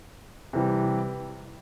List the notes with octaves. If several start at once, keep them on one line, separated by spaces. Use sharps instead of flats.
C3 E3 G3